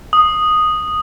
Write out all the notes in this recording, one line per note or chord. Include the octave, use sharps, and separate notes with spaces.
D#6